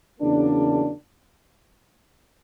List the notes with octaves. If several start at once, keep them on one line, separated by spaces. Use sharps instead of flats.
E2 C#3 F#3 A#3 D4